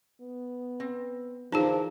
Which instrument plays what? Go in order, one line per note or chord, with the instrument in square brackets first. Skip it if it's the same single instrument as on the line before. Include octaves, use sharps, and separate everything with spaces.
[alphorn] B3
[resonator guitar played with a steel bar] C4
[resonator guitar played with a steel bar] D3 A#4 A5 [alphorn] E3 [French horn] F3 [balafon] D#4 G#4